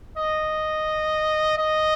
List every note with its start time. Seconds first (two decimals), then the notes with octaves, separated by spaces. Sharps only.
0.17 D#5
1.58 D#5